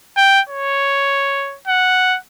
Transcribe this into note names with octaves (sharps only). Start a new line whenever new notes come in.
G5
C#5
F#5